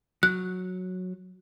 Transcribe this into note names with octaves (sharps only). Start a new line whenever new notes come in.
F#3 F#6